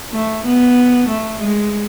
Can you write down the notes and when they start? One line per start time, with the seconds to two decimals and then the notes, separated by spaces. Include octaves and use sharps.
0.13 A3
0.45 B3
1.08 A3
1.41 G#3